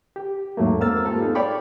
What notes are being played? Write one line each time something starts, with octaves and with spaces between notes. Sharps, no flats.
G4
E2 G#2 F#3 A3 A#3
G#3 A#3 C4 E6 F6 A6
F4 G4 A4
B3 D#4 G#4
C#5 D5 F5 G5 B5 C#6